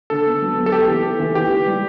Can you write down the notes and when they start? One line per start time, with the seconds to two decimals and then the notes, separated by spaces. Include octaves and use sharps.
0.10 D3 A4
0.26 B3
0.42 F#3
0.57 B3
0.66 A4
0.72 A3 G4
0.88 E3
1.04 A3
1.20 E3
1.35 E3 G4
1.51 E3
1.66 G3